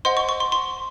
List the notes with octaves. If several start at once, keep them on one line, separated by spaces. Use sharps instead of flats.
C5 D#5 F#5 C6
C#6
C#6
C6
C6